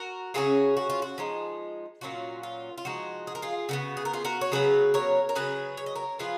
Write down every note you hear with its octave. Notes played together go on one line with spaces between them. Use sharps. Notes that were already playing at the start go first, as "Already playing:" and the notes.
Already playing: F#4 A#4
C#3 F#3 C#4 F4 G#4
F#4
F4
F#4
F3 G#3 D#4
A#2 F#3 C#4 F4 F#4
F4
F4
F3 G#3 D#4 F#4
G#4
A#4
F4 G#4
C#3 G#3 B3 F#4
G#4
A#4
F4 G#4
F#4 A#4
C#5
C#3 F#3 B3 G#4 B4
A#4 C#5
A#4
C#3 F#3 B3 G#4 B4
C#5
D#5
A#4 C#5
F3 B3 F4 G#4 B4